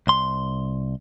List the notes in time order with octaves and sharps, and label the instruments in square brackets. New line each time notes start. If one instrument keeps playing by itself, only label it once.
[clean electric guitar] C2 C6